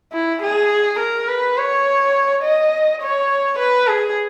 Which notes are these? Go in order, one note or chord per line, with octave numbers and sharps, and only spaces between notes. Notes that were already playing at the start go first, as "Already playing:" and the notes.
E4
G#4
A#4
B4
C#5
D#5
C#5
B4
G#4